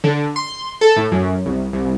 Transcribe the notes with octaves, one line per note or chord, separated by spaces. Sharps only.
D3
C6
A4
A2
F#2
C2
C2